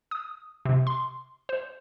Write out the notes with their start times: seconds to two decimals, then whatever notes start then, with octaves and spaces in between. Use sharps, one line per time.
0.11 D#6
0.65 C3
0.87 C6
1.49 C5